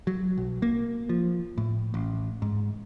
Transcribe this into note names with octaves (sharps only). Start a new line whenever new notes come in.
F#3
B1
A#3
F3
A2
A1
G#2